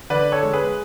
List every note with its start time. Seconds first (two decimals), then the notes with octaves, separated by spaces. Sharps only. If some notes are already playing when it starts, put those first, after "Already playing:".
0.10 D3 B4 D5
0.32 A4 C#5
0.43 G#3
0.53 G#4 B4